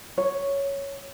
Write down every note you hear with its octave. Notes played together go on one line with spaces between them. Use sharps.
C#5